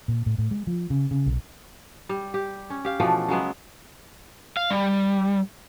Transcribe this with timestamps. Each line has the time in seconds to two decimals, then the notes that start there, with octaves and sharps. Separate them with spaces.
0.08 A#2
0.26 A2
0.38 A2
0.51 G#3
0.67 F3
0.90 C#3
1.11 C#3
1.26 B1
2.09 G3
2.34 G4
2.70 C#4
2.85 G4 F5
3.00 B2 E3 F3 A3
3.29 C#3 F#3 G#3 B3
4.57 F5
4.70 G3